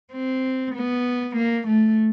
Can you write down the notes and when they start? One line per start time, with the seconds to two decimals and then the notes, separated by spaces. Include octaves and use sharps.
0.13 C4
0.75 B3
1.36 A#3
1.67 A3